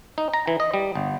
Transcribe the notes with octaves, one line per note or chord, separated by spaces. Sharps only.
D#4
A#5
E3
D#5
G3
G1